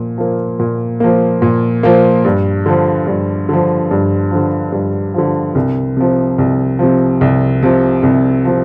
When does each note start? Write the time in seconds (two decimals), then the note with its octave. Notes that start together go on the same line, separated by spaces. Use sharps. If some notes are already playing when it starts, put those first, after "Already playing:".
Already playing: A#2 F3
0.18 F3 A#3
0.59 A#2
1.00 F3 A#3
1.42 A#2
1.83 F3 A#3
2.25 G2
2.66 D3 F3
3.07 G2
3.49 D3 F3
3.91 G2
4.31 D3 F3
4.72 G2
5.14 D3 F3
5.55 C2
5.97 C3 F3
6.38 C2
6.79 C3 F3
7.21 C2
7.63 C3 F3
8.03 C2
8.45 C3 F3